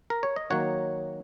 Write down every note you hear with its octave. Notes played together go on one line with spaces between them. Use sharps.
A#4
C#5
D#5
D#3 F#3 A#3 C#5 F#5